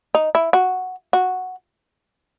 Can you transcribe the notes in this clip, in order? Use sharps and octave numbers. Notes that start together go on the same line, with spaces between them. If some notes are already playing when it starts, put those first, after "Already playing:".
D#4
E4
F#4
F#4